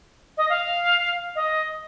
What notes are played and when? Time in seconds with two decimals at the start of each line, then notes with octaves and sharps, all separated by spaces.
0.37 D#5
0.49 F5
1.36 D#5